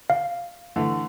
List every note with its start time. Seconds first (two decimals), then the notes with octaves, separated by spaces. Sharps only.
0.10 F5
0.76 D3 E3 A3